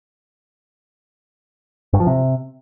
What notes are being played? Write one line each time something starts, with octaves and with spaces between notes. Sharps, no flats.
G2
F3
C3